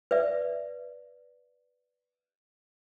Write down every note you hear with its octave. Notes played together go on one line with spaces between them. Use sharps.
B4 D5 E5